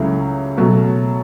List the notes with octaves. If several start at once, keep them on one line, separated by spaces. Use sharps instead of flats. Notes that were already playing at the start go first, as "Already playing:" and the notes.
Already playing: C#2 C#3 F#3 A3 E4
B2 F#3 A3